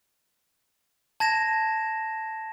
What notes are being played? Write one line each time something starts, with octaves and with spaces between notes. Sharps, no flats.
A5 G#6 A#6 E7